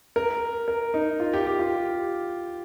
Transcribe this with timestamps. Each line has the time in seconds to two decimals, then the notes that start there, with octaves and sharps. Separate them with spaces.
0.16 A#4
0.68 A#4
0.94 D#4
1.20 F4
1.34 G4
1.47 G4
1.59 F4